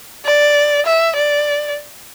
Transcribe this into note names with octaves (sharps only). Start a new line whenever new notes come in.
D5
E5
D5